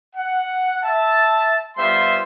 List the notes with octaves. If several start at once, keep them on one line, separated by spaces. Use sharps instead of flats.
F#5
E5 A5
G3 B3 F4 C5 E5 C6